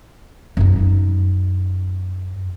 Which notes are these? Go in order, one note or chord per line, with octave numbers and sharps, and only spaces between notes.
F#2 D#4